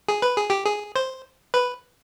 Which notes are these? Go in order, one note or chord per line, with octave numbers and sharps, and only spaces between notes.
G#4
B4
G#4
G4
G#4
C5
B4